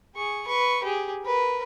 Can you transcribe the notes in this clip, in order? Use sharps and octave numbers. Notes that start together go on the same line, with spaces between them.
G#4 C#6
B4 C#6
G4 G#4
A#4 B4